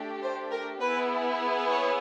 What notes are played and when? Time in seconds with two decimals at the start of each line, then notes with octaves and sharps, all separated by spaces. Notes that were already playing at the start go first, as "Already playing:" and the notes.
Already playing: A3 D4 G4
0.21 C5
0.51 A#4
0.80 B3 E4 G#4 B4
1.69 C#5